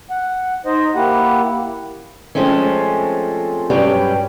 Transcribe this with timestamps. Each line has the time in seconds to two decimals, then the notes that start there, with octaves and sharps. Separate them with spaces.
0.10 F#5
0.66 D#4 C5 D#5
0.95 A#3 E4 G4 F#5
2.35 F3 G#3 A3 C4 C#4
3.70 G2 F#3 C#4 G4 B4 G5